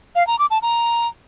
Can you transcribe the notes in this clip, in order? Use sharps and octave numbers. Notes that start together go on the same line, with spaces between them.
F5
A#5
D6
A5
A#5